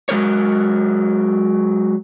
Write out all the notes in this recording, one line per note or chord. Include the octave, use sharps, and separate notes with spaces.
F#3 G#3 A#4 C#5